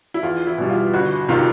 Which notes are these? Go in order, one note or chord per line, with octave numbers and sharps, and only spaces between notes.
E4
E2 F4
E4
B2 G3
F4
G1 F#4
C3 D#3 F4